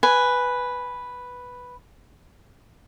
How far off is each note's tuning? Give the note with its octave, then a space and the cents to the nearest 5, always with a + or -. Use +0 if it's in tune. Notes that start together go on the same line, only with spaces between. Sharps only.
B4 +0 G#5 +0